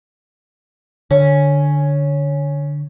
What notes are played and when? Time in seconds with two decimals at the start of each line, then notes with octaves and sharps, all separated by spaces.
1.11 D3 C#4